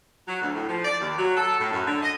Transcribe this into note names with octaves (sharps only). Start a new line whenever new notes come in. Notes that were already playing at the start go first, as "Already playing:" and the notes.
F#3
D2
A2
F3
D5
D#2
F#3
A4
A2
F#2
D3
D#5